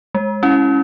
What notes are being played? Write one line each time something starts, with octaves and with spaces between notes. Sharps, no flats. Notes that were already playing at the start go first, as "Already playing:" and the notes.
G#3
C#4 E4